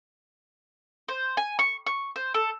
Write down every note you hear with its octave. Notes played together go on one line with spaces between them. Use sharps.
C5
G#5
C#6
C#6
C5
A4